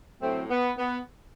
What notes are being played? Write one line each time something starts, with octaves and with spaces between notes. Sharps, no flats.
A2 F#3 A3 C4
B3
B3